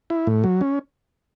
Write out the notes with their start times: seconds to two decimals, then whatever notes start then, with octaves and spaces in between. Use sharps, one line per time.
0.10 E4
0.27 A2
0.44 F#3
0.61 C#4